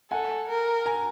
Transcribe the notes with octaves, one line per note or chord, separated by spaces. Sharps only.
A4 F#5 G#5
A#4
G#5 A#5